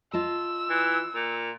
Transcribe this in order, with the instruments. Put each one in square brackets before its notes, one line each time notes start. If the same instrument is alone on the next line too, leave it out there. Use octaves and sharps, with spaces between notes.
[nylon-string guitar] F4 D#5 A5 [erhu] E6
[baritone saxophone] E3
A#2